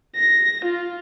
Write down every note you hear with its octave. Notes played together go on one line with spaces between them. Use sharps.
A#6
F4